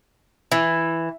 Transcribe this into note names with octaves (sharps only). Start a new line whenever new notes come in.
E3